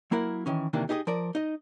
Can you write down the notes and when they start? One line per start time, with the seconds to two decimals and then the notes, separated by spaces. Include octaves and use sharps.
0.11 F#3 A#3 E4 A#4 F#5
0.46 D#3 E3 C#4
0.73 C3 D#3 E3 A#3 D4
0.89 D#4 G4 G#4 C5 D#5
1.07 F3 A#4 D5
1.35 D#4 D#5